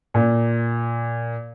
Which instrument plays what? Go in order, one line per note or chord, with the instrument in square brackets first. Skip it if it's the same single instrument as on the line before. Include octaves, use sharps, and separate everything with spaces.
[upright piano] A#2